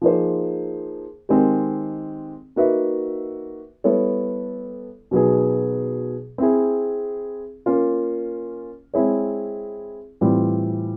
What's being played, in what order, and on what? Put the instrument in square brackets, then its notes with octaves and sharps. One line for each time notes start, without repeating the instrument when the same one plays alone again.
[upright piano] F3 A#3 D#4 G#4 C5
D#3 G#3 C4 D#4 G4
A#3 D#4 F#4 B4 E5
G3 B3 E4 A4 C#5
B2 F#3 B3 D#4 G#4
C4 E4 G#4
A#3 C#4 F4
G#3 C4 E4 G#4 C#5
A2 E3 G3 C4 F4